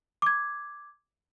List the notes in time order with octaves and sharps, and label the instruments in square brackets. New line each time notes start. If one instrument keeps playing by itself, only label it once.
[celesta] D6 G#6